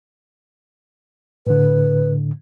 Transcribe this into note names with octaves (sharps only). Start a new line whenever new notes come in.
A2 D3 B4